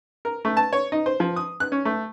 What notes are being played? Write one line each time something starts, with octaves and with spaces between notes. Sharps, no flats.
A#4
A3
A5
C#5
D#4
C5
F3
D#6
F#6
C#4
A3